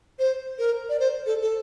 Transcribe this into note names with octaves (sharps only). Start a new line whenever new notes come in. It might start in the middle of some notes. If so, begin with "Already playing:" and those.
C5
A#4
D5
C5
A4
A4